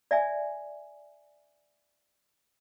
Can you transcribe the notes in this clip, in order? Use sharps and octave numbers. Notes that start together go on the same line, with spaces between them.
D5 E5 G#5